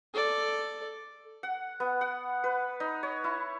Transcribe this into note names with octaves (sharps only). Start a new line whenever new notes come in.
A4 D5
F#5
B3
F#5
B4
D#4
C#5
E4